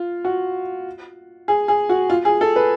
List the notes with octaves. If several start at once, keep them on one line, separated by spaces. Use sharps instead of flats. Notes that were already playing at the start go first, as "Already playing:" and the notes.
Already playing: F4
F#4
G#4
G#4
F#4
F4
G#4
A4
B4